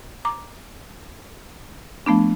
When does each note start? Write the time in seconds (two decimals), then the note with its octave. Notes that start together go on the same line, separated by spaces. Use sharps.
0.25 A#5 D6
2.06 F3 A3 B3 D4